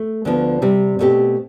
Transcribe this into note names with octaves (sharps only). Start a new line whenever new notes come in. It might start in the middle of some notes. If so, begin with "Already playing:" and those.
Already playing: A3
D2 D3 F3 B3
C3 G3 C4
B2 A3 C4 G4